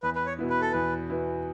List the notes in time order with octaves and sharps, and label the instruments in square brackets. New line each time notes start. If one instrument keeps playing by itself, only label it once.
[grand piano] E2 [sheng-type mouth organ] B4
[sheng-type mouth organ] B4
C#5
[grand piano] B2 B3 E4
[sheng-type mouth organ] B4
A4
[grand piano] E2 [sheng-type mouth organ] B4
[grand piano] B2 B3 E4